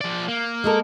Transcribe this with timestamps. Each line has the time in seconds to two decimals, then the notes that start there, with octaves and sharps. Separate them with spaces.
0.01 F3 D5
0.28 A#3
0.64 G#3 A4 A#4